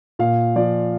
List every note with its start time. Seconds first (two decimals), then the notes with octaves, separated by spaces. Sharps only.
0.19 A#2 F5
0.56 F3 D5